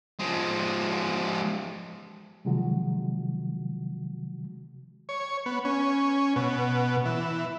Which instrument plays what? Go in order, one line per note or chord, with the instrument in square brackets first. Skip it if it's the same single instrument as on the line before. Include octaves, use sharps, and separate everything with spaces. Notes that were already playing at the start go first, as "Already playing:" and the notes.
[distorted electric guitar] F3 G#3
[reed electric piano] C3 D#3 F3 F#3 G#3 F#4
[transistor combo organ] C#5
B3
C#4
B2
E3